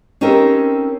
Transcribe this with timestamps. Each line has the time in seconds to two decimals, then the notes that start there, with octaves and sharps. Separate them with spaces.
0.21 C4 C#4 D#4 G4 A4 A#4